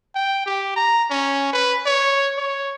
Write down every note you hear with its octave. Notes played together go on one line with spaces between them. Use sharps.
G5
G4
A#5
C#4
B4
C#5
C#5